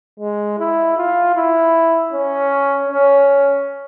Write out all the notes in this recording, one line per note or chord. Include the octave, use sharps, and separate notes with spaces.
G#3
E4
F4
E4
C#4
C#4